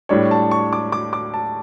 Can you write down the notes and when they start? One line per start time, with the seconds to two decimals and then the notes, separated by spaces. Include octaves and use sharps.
0.09 A2 G3 D4 C#5
0.31 A5
0.51 C#6
0.73 D6
0.92 D6
1.13 D6
1.34 A5